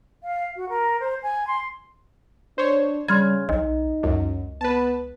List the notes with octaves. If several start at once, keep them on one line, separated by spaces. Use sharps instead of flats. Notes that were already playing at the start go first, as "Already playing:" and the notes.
F5
F#4
A#4
C5
G#5
C6
D4 C5 C#5
C#3 G3 C6 F6 G#6
B1 D#4 D#5
C#2 F#2
B3 B4 A5